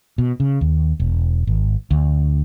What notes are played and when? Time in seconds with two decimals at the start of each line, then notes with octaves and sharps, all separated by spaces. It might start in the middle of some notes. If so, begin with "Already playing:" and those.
0.18 B2
0.40 C#3
0.61 D#2
1.00 E1
1.47 G#1
1.91 D2